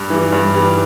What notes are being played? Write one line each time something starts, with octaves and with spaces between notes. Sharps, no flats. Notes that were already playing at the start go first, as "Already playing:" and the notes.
Already playing: G2
E3 G3
G2
E3 G3